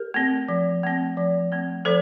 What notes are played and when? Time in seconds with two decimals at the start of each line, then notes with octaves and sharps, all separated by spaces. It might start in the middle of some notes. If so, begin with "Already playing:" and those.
Already playing: G4 A#4
0.14 A3 C4
0.48 F3
0.83 A3 C4
1.17 F3
1.52 A3 C4
1.85 F3 A4 C5